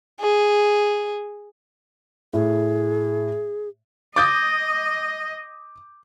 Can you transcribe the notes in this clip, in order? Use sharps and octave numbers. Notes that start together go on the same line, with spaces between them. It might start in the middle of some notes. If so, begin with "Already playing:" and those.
G#4
A2 G#4
D#5 D6 D#6 G6 A6